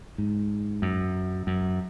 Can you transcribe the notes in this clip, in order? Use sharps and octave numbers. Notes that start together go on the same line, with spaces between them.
G#2
F#2
F#2